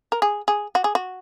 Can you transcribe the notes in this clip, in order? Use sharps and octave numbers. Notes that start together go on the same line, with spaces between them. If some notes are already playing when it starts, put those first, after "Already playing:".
A#4
G#4
G#4
F#4
G#4
F#4